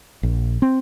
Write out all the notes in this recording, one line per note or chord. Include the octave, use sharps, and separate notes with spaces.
A#1
C4